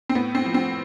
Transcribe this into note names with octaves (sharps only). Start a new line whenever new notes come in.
C4
A2 B3
C4
F3
C4